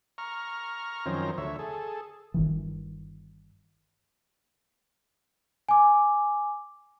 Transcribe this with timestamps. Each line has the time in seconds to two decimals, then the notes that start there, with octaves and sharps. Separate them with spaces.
0.18 A#5 C#6 F6
1.06 F#2 D#3 F3 C4 C#4 A#5
1.38 D2 C#5 E5
1.59 G#4 A4
2.34 G1 D#3 E3
5.69 G#5 D6